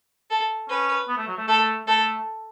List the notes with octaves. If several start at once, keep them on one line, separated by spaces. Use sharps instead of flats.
A4
C#4 B4
B3
A3
F#3
A3
A3 A4
A3 A4